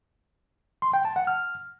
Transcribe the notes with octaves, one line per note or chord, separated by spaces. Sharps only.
C6
G5
A5
F#5
F6